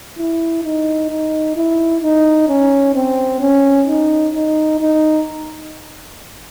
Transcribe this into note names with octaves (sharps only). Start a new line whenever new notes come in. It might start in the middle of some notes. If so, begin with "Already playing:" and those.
E4
D#4
D#4
E4
D#4
C#4
C4
C#4
D#4
D#4
D#4